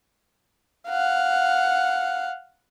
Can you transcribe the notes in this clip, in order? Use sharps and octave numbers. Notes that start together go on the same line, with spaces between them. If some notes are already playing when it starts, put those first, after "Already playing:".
F5 F#5